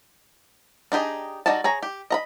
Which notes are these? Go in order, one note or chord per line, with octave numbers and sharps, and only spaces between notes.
D4 D#4 G4 G#4
G3 D#4 F#4 D5 A5
G#4 C#5 A#5
G4
D#5 A#5 B5